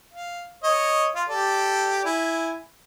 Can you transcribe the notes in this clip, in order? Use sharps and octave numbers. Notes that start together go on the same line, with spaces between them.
F5
C#5 D#5
F4
G4 A4 D5
E4 G#5